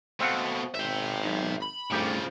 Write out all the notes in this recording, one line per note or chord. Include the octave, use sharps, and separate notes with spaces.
B2 A3 C4 F5 F#5
G#1 E5 G5
F#3 D#4
B5
C2 G2 C#3 F3 A3 G4